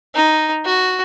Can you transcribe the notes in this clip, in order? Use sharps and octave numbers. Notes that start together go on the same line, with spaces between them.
D#4
F#4